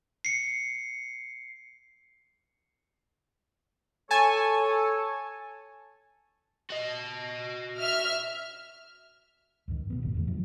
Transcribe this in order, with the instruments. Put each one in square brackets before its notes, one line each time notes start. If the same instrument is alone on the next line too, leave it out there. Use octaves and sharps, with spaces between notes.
[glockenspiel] C7 C#7
[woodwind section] A4 C#5 [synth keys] G#5 A5
[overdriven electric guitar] F#4 D#5
[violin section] E5 F6
[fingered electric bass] C#2 G2 D#3
B2 G3 B3
E1 A1 B2 D#3
E2 D3 A3
G2 F3 F#3